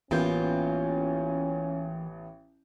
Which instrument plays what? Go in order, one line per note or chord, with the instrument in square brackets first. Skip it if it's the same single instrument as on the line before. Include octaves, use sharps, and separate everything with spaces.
[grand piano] A1 B3 G6 [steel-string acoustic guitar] E3 A#3 F4 [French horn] C#4